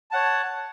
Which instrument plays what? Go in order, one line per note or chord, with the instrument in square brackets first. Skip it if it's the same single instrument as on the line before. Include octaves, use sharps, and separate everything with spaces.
[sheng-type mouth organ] C#5 F#5 A5